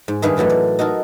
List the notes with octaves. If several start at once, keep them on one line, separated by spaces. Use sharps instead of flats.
G#2
G2 D#3 B4 E5 F5 G#5
A2 E3 F#3 A3 C#4
D5
D#4 F#4 A4 A#4